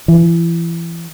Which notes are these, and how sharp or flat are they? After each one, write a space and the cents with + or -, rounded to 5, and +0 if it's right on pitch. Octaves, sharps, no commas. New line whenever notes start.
E3 +30